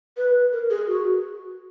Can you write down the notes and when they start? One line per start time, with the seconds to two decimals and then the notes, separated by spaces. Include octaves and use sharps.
0.17 B4
0.52 A#4
0.70 G#4
0.88 F#4